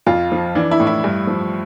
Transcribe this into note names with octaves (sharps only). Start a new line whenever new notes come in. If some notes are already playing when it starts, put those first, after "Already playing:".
F2 F4
F3
E3 D4
E4
A2
E4
G2
F3